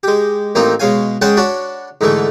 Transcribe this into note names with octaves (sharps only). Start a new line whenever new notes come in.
G#3 G4
A1 A#3 C4 D#4 F4
B2 G#3 C#5 F5 G#5
G#3 C#4 G#4 F#5 G5 A5
D4 F#4 C#5 A5 B5
G#2 D3 E3 A3